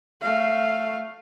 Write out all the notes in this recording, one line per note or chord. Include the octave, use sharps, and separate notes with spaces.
A3 F5